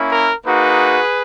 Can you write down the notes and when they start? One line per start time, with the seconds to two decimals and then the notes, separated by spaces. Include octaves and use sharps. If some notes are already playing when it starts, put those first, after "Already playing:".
Already playing: A#3 C#4 E4
0.09 A#4
0.45 A#3 D#4 F#4 G#4 B4